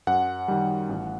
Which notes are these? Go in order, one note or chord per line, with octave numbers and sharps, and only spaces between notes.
F#2 F#5
D#3 G3
A1